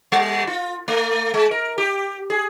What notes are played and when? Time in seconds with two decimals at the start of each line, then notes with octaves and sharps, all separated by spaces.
0.12 G3
0.47 F4
0.88 A3
1.34 G#3
1.51 A#4
1.78 G4
2.30 G#4